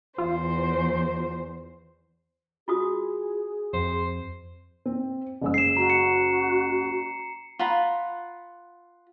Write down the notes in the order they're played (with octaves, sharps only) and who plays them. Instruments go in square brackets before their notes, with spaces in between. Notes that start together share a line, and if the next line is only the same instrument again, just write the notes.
[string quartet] E2 C5 [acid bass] F4
[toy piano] F4 F#4 D#6 [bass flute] G#4
[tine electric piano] F2 [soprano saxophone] C5
[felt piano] C4
F#1 G#3 E6
[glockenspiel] C7 E7
[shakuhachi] F#4 [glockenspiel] A#5
[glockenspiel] C#7
[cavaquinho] F4 F#5 A#5 B5